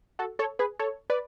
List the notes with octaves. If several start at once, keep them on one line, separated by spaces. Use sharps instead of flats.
F#4 A4
A4 C#5
G#4 B4
A4 C#5
B4 D5